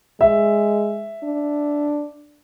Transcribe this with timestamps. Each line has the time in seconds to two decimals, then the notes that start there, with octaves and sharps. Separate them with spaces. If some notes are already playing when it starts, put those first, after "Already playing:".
0.21 G#3 E5
1.24 D4